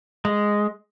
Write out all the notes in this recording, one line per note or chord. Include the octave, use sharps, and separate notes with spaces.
G#3